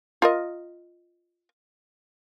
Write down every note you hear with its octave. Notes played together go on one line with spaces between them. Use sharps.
F4 A#4 D#5